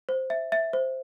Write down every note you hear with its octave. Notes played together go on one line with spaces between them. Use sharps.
C5
E5
E5
C5